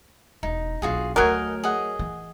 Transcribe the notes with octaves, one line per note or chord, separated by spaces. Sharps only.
E1 D#4
B1 D4 F4 F#4 G#4
D2 F#3 A3 A#4 D#5 G#5
G#4 D#5 F#5
E3